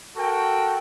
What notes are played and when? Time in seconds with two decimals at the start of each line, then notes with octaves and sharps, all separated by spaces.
0.16 F#4 A4 A#4 G5